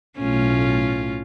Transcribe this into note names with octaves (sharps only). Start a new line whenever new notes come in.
B1 A2 A3 C#4 F4